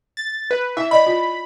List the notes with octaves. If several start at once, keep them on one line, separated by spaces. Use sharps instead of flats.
A6
B4
E4 E5
D5 D#5 B5
F4